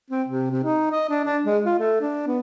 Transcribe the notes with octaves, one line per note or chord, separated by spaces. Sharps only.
C4
C3
C3
D#4
D#5
D4
D4
G#3
F4
A3
D4
B3